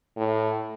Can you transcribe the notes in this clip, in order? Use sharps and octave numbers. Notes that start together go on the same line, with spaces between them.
A2